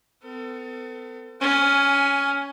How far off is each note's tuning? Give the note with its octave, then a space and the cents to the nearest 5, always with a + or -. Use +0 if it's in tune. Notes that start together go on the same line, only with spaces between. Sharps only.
B3 +45 A4 +30
C#4 +15 G#5 +0